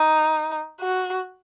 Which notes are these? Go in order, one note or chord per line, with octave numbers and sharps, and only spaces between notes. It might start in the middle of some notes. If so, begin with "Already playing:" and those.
Already playing: D#4
F#4